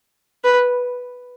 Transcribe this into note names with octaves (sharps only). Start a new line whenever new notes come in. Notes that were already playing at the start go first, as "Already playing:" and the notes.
B4